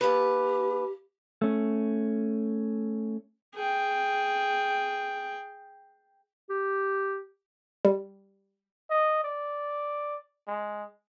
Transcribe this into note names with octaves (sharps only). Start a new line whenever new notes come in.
D#2 G4 B4
A3 C#4
G#4 G5
G4
G3
D#5
D5
G#3